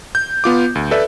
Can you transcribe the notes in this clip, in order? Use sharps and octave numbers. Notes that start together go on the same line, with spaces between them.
G6
B3 F4 D6
D2
A4 B4 D5 E5